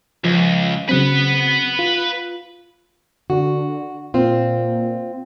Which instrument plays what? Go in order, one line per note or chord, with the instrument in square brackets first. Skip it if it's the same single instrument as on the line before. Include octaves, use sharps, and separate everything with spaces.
[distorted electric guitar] C#2 [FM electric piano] F3
[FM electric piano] C#3 F#3 C4 [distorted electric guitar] B4 F#5
[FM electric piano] F4
[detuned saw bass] D3 [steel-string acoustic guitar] F#4
[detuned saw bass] A#2 [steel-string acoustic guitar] C4 F4